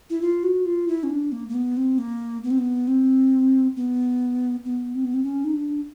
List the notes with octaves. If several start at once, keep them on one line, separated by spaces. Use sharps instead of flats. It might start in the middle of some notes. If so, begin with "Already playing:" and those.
E4
F4
F#4
F4
E4
C#4
D4
A#3
A#3
B3
C4
A#3
B3
C4
B3
C4
B3
B3
C4
B3
C4
C#4
D#4
D4